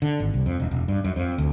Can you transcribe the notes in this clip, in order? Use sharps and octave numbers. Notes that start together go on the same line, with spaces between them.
D3
G#1
C2
F2
E1
E1
G2
F#2
F2
D2